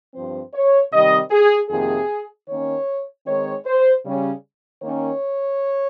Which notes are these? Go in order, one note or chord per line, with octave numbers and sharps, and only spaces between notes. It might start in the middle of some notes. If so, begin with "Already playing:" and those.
G2 F3 C4 C5
C#5
C3 D#3 G3 C4 D#5
G#4
F2 C3 D#3 A#3 G#4
D#3 A#3 C#4 C#5
D#3 G#3 C4 D#4 C#5
C5
C#3 G3 C#4
D#3 A#3 C#4 C#5